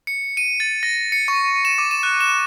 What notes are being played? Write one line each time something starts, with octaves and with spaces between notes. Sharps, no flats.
C#7
D#7
A6
A#6
C#7
C#6
E7
D6
E7
F#6
E7